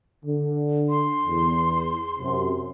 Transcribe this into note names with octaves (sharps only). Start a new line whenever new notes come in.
D3
C6
E2
F#2 C3